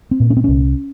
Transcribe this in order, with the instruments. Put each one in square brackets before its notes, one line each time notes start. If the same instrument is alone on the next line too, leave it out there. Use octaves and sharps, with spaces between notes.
[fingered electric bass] C4
A#2
C#4
C4
C2 C#4